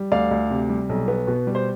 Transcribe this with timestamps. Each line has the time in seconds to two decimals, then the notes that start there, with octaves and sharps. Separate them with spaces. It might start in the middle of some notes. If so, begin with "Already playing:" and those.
Already playing: G3
0.12 D2 D5 F5
0.31 D2
0.50 C3
0.69 G3
0.89 B1
1.08 B3
1.27 B2
1.47 G3
1.55 C5